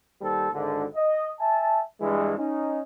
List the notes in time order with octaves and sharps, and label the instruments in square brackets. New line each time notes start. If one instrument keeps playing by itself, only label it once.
[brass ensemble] D#2 G3 A4 C5
G#1 D3
D#5
E5 G#5 A5
G2 E3 G#3
C#4 D#4